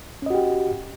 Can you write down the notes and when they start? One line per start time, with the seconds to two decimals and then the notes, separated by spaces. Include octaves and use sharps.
0.22 C#4
0.26 D#5
0.30 F#4
0.34 G4